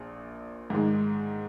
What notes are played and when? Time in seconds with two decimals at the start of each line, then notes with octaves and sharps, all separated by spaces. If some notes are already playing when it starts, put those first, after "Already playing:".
Already playing: A#1 A#2
0.70 G#2 D#3 G#3